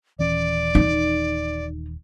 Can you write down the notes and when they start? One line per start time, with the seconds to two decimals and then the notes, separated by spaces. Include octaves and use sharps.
0.19 D#1 E3 C#4 D5
0.75 D#4